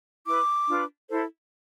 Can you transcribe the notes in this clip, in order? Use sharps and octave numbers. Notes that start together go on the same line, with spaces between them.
E4 B4 D6
D4 F4 B4
E4 A4 C5